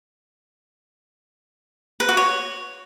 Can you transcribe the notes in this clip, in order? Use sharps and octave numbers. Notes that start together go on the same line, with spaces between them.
B4
F#4
C#5